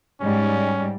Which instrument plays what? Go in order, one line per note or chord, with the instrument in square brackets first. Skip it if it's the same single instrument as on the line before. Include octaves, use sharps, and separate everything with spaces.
[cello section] G#2 G3 [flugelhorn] C#4